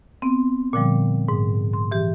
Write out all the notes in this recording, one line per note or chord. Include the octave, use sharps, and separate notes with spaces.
B3 C4
A#2 D3 F3 G3
G#2
C6
E3 G4